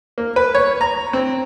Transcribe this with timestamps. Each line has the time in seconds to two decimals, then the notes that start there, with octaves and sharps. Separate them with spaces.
0.18 A#3
0.36 B4
0.55 C#5
0.81 A#5
1.13 C4